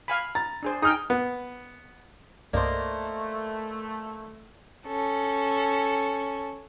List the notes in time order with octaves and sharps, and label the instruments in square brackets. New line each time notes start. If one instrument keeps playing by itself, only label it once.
[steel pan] F5 G#5 B5
[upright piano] A#5 A6
[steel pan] D4 G#4 C5
[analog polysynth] D#4 G5 [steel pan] G#4 [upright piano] D#6 F6
[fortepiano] B3
[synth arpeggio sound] C2 G2 [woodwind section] A3 [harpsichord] A#3 C5 [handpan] D5 D#5
[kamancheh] C#4 A4